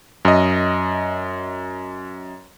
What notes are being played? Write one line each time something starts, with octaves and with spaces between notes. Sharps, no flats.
F#2 D#5